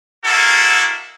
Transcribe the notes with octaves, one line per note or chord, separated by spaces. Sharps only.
G#3 A#3 E4 F#4 A4